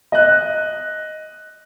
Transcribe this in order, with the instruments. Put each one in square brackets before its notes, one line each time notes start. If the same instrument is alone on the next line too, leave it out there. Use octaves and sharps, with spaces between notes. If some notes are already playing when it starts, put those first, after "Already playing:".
[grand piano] D#5 F#6